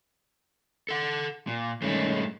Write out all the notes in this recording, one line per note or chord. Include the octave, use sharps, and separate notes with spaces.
A4 F#5
A#2
G2 D#3 G#3 A3 C#4